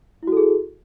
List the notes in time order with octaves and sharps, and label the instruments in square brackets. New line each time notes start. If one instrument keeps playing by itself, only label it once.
[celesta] E4
F#4
A4
G#4